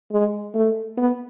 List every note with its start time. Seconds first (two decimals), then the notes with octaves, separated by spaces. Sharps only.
0.11 G#3
0.54 A3
0.97 B3